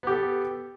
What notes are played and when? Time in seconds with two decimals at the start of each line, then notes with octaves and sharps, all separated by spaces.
0.03 B3
0.07 G4
0.11 A4